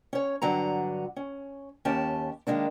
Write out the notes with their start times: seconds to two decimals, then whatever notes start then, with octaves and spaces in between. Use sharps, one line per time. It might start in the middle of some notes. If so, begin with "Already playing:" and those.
0.13 C#4 C#5
0.42 G2 D3 F#3 F#5 A#5
1.16 C#4
1.85 D#2 C#4 G4 A5
2.47 D#3 E3 G#3 A#3 D4